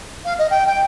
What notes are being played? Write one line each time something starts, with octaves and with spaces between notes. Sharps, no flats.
F5
D#5
G5
G5